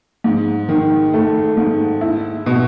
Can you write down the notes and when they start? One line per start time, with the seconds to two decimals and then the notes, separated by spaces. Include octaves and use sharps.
0.24 G#2
0.69 D#3
1.13 A3
1.57 G#2
2.01 E4
2.46 B2